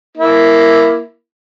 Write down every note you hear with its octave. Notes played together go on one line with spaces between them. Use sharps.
A#3 E4